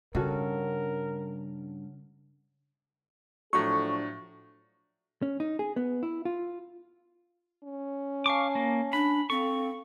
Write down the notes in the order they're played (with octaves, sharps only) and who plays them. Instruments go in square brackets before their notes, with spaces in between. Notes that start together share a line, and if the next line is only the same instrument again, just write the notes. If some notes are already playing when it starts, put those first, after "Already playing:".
[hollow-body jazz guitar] G2 [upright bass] C#3 [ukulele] C#4 F#4 A4 [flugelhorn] A#4
[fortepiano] A2 F#3 [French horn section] F3 D4 A4 [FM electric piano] C#6
[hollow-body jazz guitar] C#4
D#4
G#4
B3
E4
F4
[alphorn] C#4
[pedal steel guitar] F5 C#6 D6 [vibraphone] G#5 A5
[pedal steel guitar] A#3
[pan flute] D4 [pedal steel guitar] B5
[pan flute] C4 [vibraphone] A4 F5 [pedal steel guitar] C#6